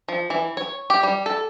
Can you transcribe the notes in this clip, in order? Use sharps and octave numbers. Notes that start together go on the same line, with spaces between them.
F3
E3
C#5
G4
G3
A4